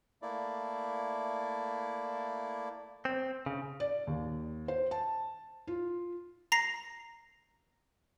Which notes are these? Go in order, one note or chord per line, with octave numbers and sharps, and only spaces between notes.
A3 A#3 E4 D5
C4
C#3
D5
D#2
C5
A5
F4
A#5 A#6 C7